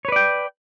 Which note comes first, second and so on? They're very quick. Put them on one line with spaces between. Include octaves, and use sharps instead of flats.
C#5 B4 D5 G5